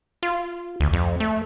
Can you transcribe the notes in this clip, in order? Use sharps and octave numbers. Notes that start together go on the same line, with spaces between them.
F4
D2
F2
A3